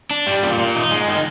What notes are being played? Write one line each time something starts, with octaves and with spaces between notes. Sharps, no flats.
D4
G3
A#2
A#2
D#4
G#3
D#3